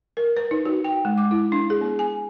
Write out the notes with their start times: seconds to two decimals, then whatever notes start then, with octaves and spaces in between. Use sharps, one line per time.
0.17 A#4
0.37 B4
0.51 D#4
0.65 F#4
0.84 G5
1.05 G#3
1.18 D6
1.31 E4
1.52 D4
1.70 G#4
1.81 B3
1.99 G#5